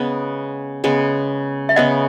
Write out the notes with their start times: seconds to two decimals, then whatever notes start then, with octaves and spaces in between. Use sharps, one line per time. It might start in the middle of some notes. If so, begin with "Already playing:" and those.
Already playing: C#3 G#3 B3
0.84 C#3 G#3 B3
1.69 E5
1.76 C#3 G#3 B3 D#5 F#5